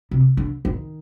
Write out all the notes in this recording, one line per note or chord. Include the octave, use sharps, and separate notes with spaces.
C3
D3
D#3